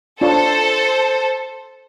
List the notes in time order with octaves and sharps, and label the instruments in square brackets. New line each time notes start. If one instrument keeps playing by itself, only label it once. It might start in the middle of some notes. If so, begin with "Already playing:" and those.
[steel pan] D4 F4 C#5 [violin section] A4 C5